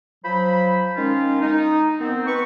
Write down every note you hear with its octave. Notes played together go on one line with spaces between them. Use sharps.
F3 F#3 C5 B5
D#3 G#3 C#4 D#4 F4
D#4
D#3 B3 C4
B4 C#6